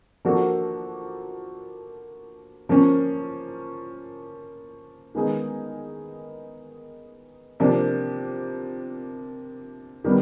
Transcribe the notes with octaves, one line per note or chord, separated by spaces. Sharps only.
F3 A#3 D4 F#4 A4
F3 A#3 C#4
D#3 G#3 B3 D#4 G#4
C3 F3 A#3 D4
D#3 G3 B3